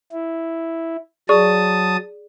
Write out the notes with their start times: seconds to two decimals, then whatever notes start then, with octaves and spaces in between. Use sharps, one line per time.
0.12 E4
1.29 F#3 G#4 D5 A5 C#6 D#6